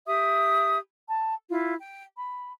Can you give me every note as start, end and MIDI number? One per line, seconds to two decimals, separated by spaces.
0.07 0.78 67
0.07 0.78 76
0.07 0.78 87
1.08 1.34 81
1.50 1.75 64
1.50 1.75 65
1.81 2.05 79
2.17 2.52 83